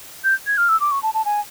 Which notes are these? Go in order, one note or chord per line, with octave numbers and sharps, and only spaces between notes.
G6
G#6
F6
E6
D6
C#6
A5
A5
G#5